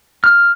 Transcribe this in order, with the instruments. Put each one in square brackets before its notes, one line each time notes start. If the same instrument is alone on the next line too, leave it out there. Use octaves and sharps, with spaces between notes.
[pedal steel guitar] F6